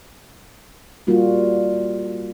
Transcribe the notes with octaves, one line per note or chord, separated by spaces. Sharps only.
G3 A#3 F4 F#4